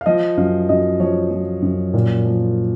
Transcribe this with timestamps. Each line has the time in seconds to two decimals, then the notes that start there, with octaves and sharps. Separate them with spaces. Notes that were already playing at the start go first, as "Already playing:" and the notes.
0.01 F5
0.06 F3 D#5
0.37 F#2 F5
0.69 F#2 D#5
1.00 F3 C#5
1.31 F3
1.62 F#2
1.94 A#2
2.25 F3